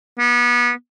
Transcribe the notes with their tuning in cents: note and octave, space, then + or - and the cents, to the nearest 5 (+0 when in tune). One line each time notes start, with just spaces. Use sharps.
B3 -30